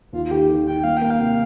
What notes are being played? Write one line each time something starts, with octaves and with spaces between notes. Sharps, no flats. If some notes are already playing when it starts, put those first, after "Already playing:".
D#2 F4
F4
D#3 G4
D#3
D#3 G5
A#3 F5
A#3 G5
F5
C3